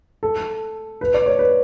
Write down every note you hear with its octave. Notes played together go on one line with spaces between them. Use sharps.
A4
B4
D5
C#5
B4